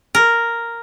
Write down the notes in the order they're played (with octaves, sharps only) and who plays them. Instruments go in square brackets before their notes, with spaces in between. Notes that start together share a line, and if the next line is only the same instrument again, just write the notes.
[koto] A#4